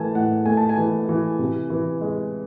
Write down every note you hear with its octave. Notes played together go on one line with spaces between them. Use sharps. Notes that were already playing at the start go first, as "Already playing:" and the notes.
Already playing: E3 A3 G#5 A5
A2 F#5
A3 G#5
A5
G#5
E3
E3
C3
E3
G#3